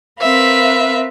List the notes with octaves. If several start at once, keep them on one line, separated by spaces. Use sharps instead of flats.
C4 A#4 B4 E5 F5